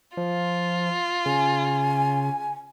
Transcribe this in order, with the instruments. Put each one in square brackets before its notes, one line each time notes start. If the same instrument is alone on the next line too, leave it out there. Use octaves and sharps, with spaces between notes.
[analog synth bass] F3 [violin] F4
[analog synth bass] C#3 [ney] G#5